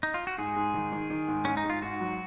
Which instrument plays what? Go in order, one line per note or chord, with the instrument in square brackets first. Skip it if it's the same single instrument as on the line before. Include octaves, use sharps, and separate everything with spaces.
[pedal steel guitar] D#4
F4
F#4
[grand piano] G#2 [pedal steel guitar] G#4
[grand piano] G#2
D#3
D#3
D#3
G#2
[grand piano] G#2 [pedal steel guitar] C#4
[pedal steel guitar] D#4
[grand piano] G#2
[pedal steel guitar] F4
[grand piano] G#2 [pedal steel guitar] F#4
[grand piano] F#3